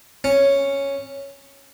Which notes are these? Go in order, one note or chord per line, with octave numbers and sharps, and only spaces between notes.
C#4